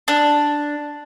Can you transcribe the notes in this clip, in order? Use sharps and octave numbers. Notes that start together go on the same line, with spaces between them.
D4